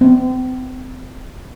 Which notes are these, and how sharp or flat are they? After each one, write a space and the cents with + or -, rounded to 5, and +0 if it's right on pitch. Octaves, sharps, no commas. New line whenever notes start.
C4 -35